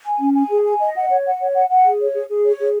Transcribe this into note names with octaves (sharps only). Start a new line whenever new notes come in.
G#5
C#4
G#5
G#4
G#5
D#5
F#5
C#5
F#5
C#5
F#5
F#5
G#4
C#5
G#4
G#4
C#5
G#4